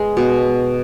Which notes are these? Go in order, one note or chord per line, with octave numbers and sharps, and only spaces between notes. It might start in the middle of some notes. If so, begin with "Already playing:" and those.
Already playing: G#3 B3
B2